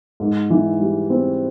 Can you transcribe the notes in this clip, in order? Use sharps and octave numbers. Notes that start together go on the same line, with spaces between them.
G#2
E3
G3
C4